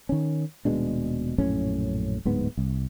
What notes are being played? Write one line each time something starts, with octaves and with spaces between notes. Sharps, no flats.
D#3 C#4
D#1 B2 G#3 D4
A#1 F#2 A2 C#4
D1 G#2 B3
C2